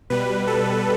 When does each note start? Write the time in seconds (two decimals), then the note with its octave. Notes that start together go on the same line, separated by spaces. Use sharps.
0.10 B2 G3 B4
0.47 A4